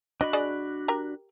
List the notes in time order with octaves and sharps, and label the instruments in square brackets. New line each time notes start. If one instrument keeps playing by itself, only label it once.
[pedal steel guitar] D4 F#4 B5 [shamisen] D#5
[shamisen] G#4 D5 D#5
G4 A#4